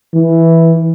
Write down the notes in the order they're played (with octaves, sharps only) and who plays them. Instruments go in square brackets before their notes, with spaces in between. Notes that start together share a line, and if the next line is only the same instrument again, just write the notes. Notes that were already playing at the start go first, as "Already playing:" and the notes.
[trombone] E3